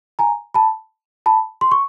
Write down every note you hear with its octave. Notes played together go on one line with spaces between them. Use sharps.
G#5 A#5
A5 B5
A5 B5
C6
C#6